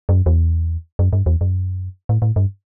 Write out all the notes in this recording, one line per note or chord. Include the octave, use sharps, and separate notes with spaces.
F#2
E2
F#2
G2
E2
F#2
A2
A2
G2